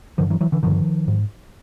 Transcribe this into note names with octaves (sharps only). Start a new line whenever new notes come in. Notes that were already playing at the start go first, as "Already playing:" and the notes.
G2 D3 D#3 F3
E3 F#3
E3 F#3
D3 E3
G2 D3 D#3 F3
G#2